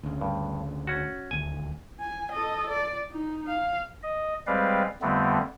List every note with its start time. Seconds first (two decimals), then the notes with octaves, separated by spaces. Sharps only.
0.03 D2 C#3
0.21 G2
0.87 C#4 F#4
1.31 D#1 D2 G#5
2.00 G#5
2.32 A4 D#5
2.70 D5
3.11 D#4
3.49 F5
4.03 D#5
4.47 G3 G#3 C4 B4 D5 F5
5.02 F2 D3 G3 A3 B3 C4